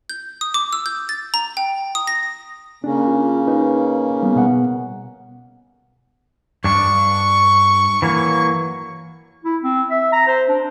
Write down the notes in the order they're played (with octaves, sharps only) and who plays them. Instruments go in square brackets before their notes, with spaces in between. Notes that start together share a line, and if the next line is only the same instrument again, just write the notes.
[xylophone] G6
D#6
D6
E6
G6
A6
A#5
G5
D#6
A#6
[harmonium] C#3 A#3 C#4 [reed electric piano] D4 G#4
[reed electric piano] F4
D#4 B4
G3 B3
B2 B3 F#5
[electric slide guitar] G2 D4 [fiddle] C#6
[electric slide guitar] E3 F#3 A#3
[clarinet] E4
C4
E5
A#5
C5
D4